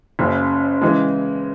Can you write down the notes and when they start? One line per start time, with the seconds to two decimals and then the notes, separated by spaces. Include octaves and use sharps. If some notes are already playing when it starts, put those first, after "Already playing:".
0.19 F#1 F#2 C#3
0.82 C#3 E3 G#3